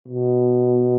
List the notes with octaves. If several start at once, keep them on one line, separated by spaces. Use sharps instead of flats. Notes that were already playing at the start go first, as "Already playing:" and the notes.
B2